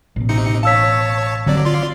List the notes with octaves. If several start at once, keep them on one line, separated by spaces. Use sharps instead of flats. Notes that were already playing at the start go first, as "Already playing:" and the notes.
A1 B2
C3 D#4 C#7
C#5 F5 A5 E6 B6
G1 D3 F#3 C4 D5
F4 D5 C6